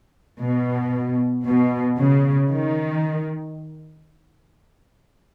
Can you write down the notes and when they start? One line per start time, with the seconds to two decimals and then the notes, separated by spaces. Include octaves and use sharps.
0.40 B2
1.46 B2
1.99 C#3
2.51 D#3